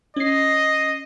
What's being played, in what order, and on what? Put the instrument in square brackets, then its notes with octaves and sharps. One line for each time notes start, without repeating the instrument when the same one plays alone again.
[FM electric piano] C#4 C7 [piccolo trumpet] D#5